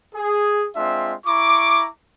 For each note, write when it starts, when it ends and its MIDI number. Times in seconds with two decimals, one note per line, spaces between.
0.14 0.68 68
0.75 1.14 56
0.75 1.14 60
0.75 1.14 62
0.75 1.14 65
0.75 1.14 76
1.26 1.87 64
1.26 1.87 82
1.26 1.87 85
1.26 1.87 86